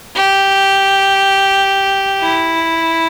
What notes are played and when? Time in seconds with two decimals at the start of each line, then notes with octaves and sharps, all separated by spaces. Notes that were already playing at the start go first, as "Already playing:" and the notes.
0.15 G4
2.21 E4